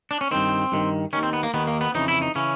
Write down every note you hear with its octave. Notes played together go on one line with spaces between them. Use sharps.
D4
C#4
G2 D#3 C4
G2 D#3
D#2 D#3 C#4
C4
B3
A#3
D#2 D#3 B3
A#3
B3
F2 C#3 E3 D#4
E4
D#4
C#3 E3 C#4